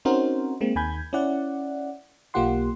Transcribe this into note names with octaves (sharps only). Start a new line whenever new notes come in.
C4 C#4 D#4 F#4 A#4 C5
G#3 A#3 C4
D#2 D#3 G#5 B5 G6 G#6
C#4 E4 D5 F#5
B1 A#3 F4 G4 F#5 C6